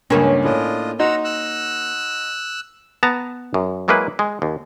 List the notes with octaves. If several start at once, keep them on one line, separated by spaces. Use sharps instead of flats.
C#2 G2 A#3 C#4
A2 D4 F4 D#5
D#4 F#4 F#5 A#5 C6 E6
E6 F#6
B3 A5 A#5
F#2
F#3 G#3 A#3 E4 B4
G#3
D#2